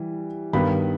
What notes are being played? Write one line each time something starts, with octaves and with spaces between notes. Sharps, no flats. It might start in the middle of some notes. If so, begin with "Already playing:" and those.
Already playing: E3 G3
G2 D#3 G3 B3 B5